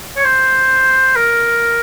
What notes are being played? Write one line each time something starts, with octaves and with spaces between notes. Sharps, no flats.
C#5
C5
A#4